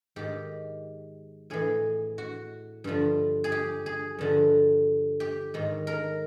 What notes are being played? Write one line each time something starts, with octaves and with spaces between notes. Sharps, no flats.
G#2 D#3 G4
A2 E3 G#4
F#4
G2 D3 F3
G#4
G4
G#4
G2 D3 F3
G4
G#2 D#3
A#4